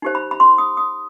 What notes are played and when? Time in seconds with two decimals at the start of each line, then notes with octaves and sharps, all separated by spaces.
0.02 D#4 G4 C5
0.15 B5
0.31 B5
0.40 C6
0.58 D#6
0.77 D#6